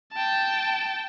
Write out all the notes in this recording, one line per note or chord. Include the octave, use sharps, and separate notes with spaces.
G5 A5